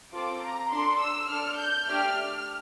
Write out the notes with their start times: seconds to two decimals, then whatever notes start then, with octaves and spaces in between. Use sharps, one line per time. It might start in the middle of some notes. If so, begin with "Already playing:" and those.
0.13 C4 F4 A4 D6
0.42 A#5
0.72 D4 A4 C6
1.01 E6
1.30 D4 A4 F6
1.59 G6
1.87 A3 D4 G4 F6